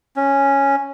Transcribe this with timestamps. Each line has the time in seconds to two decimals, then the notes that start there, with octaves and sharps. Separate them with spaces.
0.16 C#4